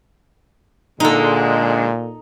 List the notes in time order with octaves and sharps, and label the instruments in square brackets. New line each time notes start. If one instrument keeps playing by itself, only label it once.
[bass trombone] A#2 [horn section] D3 G#3 [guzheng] D#4 A4